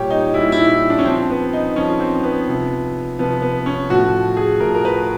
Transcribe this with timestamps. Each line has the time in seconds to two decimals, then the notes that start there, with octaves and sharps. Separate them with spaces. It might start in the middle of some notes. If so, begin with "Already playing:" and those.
Already playing: A#2 G3 G4 C#5
0.10 D#4
0.34 A#2 G3 E4
0.52 E4
0.69 E4
0.90 D4
0.99 C#4
1.05 C#3 F3 C4
1.30 B3
1.53 D#4
1.76 C#3 F3 C#4
2.00 C4
2.23 B3
2.48 C3 F3
3.19 C3 F3 B3
3.42 B3
3.66 C#4
3.90 A2 F3 F#4
4.37 G#4
4.60 A2 F3 A#4
4.75 A#4
4.85 B4